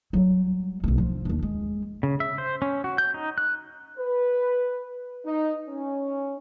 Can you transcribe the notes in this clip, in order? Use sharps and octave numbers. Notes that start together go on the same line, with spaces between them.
F#3 G3
B1 A3
F3 D4
D#2 D4
G#3
C#3
E5
C5
C#4
F#4
G6
D#4
F#6
B4
D#4
C#4